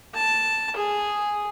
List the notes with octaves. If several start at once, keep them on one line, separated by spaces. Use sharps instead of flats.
A5
G#4